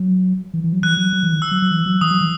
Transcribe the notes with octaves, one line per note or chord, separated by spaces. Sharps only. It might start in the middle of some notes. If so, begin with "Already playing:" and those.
Already playing: F#3
E3
E3
F#3
E3 F#6
F#3
F#3
E3
D#3
E6
F#3
F#3
E3
F#3
E3 D#6
F#3
E3